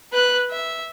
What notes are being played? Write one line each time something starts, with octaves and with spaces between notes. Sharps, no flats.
B4 F#6
E5